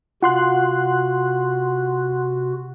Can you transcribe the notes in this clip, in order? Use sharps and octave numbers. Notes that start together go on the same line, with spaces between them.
C3 F4 F#4 F#5 C6 F#6